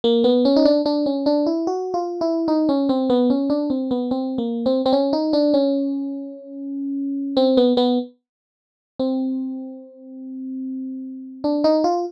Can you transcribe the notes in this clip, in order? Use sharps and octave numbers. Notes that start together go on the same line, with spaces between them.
A#3
B3
C#4
D#4
D4
D4
C#4
D4
E4
F#4
F4
E4
D#4
C#4
C4
B3
C#4
D4
C4
B3
C4
A#3
C4
C4
C#4
D#4
D4
C#4
C4
B3
B3
C4
D4
D#4
F4